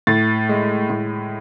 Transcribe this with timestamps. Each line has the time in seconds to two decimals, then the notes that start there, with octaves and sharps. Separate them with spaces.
0.07 A2 A6
0.49 G#3
0.90 A2